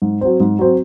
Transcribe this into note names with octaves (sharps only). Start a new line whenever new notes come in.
G#2
F#3 C4
G#2
F#3 C4